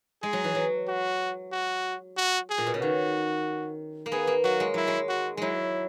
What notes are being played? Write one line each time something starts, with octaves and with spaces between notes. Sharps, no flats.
G#3 G#4
F#3
E3
F#3
F#4
F#4
F#4
G#4
A#2
B2
C#3
D#3 F#4
A#3
B3 G#4
A#3
F#3 F#4
G#3
F#3 E4
G#3
F#4
F#3 G#3 E4